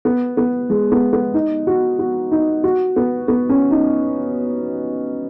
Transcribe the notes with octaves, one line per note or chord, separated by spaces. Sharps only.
B3
B3
G#3
B3
B3
D#4
F#4
F#4
D#4
F#4
B3
B3
C#4
D#4